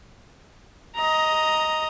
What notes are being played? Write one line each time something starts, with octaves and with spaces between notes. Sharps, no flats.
D#5 A#5